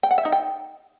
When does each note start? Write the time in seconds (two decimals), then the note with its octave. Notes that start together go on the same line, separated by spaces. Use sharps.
0.03 G5
0.11 F#5
0.18 E5
0.25 D#4
0.32 G5